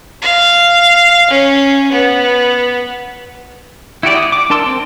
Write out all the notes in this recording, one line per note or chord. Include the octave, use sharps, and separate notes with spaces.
F5
C#4
B3
E4 F#4 G4 D5
D#6
D6
D4 A#4 A5 C6 E6
C4